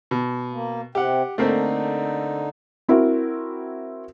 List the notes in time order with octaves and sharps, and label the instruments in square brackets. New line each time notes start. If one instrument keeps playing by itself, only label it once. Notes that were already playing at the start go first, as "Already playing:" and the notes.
[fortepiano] B2
[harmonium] A#3
[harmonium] C3 C4 [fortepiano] G4 F#5
[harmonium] D3 D#4 [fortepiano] A3 A#3 C4
[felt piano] C4 E4 F#4 A#4